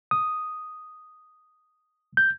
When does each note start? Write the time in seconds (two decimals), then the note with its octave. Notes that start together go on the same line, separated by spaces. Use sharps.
0.11 D#6
2.17 G6